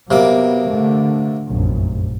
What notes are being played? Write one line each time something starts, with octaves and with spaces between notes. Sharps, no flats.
C3 F#3 A#3 B3 D6
D3 A3
F1 A#1 F#2